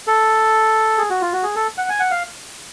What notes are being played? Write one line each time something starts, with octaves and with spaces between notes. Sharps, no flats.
A4
G#4
F#4
F4
F#4
G#4
A4
F#5
G#5
F#5
F5